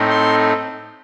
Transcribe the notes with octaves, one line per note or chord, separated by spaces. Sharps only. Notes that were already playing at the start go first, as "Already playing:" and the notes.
Already playing: A2 A3 C4 D#4
C6